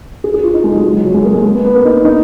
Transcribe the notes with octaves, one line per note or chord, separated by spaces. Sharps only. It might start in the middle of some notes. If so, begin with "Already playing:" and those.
G#4
G#4
F4
D#4
G#3
F#3
G#3
F#3
F#3
G#3
A#3
G#3
A#3
B3
B3
A#3
D#4
B3
D#4